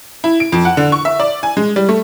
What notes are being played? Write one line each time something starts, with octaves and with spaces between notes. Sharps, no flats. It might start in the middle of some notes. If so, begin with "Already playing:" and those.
E4
D7
F2
F#5
D3
C#6
E5
D5
G#5
G#3
G3
A3